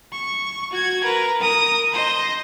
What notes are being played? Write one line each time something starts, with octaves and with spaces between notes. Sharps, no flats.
C#6
F#4 G#6
A#4 B4
A#4 D#6
C5 D#5